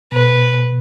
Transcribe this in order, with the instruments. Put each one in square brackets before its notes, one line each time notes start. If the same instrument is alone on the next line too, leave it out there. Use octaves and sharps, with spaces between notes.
[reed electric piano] B2 [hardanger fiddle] B4